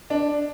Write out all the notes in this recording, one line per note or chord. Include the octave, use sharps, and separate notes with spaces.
D4